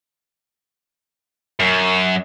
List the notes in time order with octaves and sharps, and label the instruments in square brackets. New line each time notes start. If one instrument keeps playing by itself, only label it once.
[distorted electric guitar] F#2